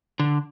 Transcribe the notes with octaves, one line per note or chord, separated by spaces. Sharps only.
D3